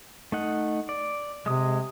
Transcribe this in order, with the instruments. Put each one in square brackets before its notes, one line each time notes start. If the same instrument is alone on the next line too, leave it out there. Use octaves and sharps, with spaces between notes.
[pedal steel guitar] A3 D#4 F#5
D5
[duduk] C3 [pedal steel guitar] G#3 D#6